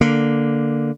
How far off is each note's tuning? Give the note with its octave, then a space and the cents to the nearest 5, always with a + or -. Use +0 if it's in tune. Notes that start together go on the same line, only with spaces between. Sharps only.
D3 +0 A#3 +0